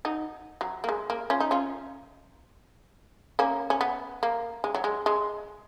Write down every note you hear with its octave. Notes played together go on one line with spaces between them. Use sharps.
D#4 F#4
F#3
A#3
G#3
A#3
C#4 F4
D#4
C#4 F4
A#3 C#4
C#4
B3
A#3
G#3
F#3
G#3
G#3